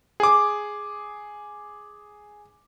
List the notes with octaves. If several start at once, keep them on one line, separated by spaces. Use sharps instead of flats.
G#4 D6